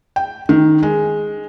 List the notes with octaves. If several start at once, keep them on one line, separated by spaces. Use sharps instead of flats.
G5
D#3
G#3